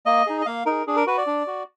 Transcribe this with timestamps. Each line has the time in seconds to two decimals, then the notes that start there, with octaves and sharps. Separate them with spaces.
0.06 A#3 D#5
0.27 D#4 G#4
0.41 D#5
0.46 A#3 F5
0.66 D#4 G#4 A#4
0.87 D4 G#4
0.96 A#4
1.07 F#4 B4
1.18 D5
1.27 D4
1.47 F#4